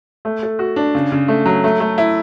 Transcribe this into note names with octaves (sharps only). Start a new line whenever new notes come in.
A3
A4
F#4
D4
C#3
C#3
A3
F#3
A3
A3
E4